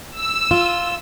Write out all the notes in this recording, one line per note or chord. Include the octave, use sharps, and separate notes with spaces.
E6
F4